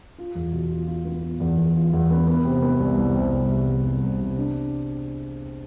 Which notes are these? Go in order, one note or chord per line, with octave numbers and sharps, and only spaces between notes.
F4
E2
B2
F4
F4
B3
F4
E2
E2
F4
E2
B3
B3
C3
B3
C2
C2
C3
C2
C3
C2
C2
C2
C3
D4